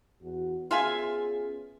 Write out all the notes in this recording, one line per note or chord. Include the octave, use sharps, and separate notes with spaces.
E2 F#4
B3 C#4 F4 G#4 E5 G#5